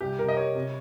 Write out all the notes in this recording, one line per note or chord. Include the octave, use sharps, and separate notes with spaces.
C2 G4
C2 A#4
D#5
G3 C#5
C3